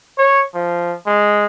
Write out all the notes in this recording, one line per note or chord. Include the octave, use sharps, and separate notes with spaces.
C#5
F3
G#3